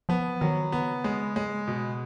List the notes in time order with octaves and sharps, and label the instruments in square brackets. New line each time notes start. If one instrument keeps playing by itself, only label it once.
[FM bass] F3 [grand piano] B3
[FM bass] D#3 [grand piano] F#3
[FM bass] C#3 [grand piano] B3
[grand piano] G#3
G#3
B2